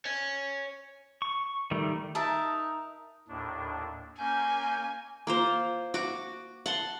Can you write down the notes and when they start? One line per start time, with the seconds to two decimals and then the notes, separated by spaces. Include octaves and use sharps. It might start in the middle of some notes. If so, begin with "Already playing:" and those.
0.05 C#5 G#5
1.22 C#6
1.71 D#3 G3 A3
2.15 D#4 A#4 E5 A5
3.28 D#2 A2 D4
4.19 A#3 C#4 G#5 G6
5.27 A#3 F4 C5
5.94 F#4 D6
6.66 F#5 A5 C6